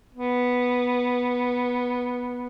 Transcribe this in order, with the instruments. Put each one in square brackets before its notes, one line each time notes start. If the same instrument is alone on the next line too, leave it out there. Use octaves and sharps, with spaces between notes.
[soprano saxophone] B3